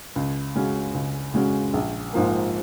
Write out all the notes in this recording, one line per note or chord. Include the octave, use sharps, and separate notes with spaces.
C#2
C#3 G#3 C#4 F#4
C#2
C#3 G#3 C#4 F#4
A#1
G#2 F3 A#3